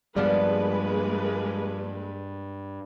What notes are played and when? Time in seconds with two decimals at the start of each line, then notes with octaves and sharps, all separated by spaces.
0.16 G2 F3 G3 G#3 A#3 B3 B4 D5